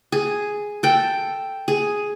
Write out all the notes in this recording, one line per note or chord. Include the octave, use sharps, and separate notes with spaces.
G#4
A4 G5
G#4